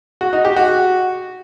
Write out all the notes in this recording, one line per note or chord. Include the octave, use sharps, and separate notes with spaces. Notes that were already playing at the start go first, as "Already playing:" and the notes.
F#4
D#4
G4
F#4